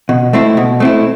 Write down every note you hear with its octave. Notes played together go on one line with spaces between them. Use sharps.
B2
A3 C4 E4
B2
A3 C4 E4